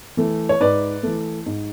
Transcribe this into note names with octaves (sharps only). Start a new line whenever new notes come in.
E3 A3
C#5
G#2 B4 D5
E3 A3
G#2